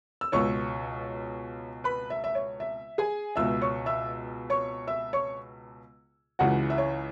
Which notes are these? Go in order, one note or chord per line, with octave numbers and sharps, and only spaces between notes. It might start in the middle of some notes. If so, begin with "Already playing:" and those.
E6
C#2 B2 C#5 C#6
B4 B5
E5
E5
C#5
E5
G#4 G#5
C#2 B2 E5 E6
C#5 C#6
E5 E6
C#5 C#6
E5 E6
C#5 C#6
C#2 C#3 E3 F#4 F#5
E5
C#5